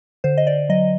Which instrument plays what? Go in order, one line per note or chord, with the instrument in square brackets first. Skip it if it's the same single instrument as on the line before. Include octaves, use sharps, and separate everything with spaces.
[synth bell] D3 C5
D#5
D5
F#3 D#5